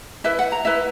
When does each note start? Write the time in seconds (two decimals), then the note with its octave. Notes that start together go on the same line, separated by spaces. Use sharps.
0.24 E4 B4 E5
0.39 F#5
0.52 A#5
0.65 E4 B4 E5